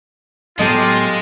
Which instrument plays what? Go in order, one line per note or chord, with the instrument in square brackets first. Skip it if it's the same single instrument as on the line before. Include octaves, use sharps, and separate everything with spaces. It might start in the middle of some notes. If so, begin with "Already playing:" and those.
[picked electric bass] A2 F#3 B3 [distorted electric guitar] G#3 [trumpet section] F4 [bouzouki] G4 A4 D#5